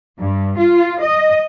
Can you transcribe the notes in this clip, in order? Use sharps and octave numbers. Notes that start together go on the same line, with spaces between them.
G2
F4
D#5